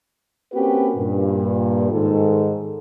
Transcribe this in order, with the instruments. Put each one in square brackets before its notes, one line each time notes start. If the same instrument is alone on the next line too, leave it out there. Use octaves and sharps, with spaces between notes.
[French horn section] A#3 C4 C#4 F#4 G4 B4
G2 A#2
G#2 D#3 A4